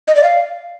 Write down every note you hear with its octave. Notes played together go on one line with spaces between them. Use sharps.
D#5
D5
F5